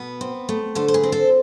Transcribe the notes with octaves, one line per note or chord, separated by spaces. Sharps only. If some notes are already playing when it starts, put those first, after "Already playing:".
Already playing: B2 B3
C4
A3
D3 A4 C5
C5
G#4 B4
C4
A4 C5